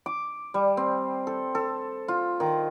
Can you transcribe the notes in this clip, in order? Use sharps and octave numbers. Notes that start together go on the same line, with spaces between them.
D6
G3
C4
A4
A4
F4
D#3